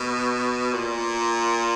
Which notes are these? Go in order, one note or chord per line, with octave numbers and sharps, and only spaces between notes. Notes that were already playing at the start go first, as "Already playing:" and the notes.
Already playing: B2
A#2